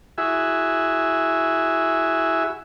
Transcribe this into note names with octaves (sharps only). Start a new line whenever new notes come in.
E4 F#4 G#4 E5